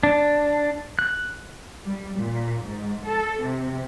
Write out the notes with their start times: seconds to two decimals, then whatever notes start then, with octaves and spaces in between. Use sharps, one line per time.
0.03 D4
0.99 F#6
1.84 G3
2.18 A#2
2.64 G#2
3.06 A4
3.41 C3